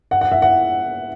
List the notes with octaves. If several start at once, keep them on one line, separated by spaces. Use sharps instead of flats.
F#5
F#5
E5
F#5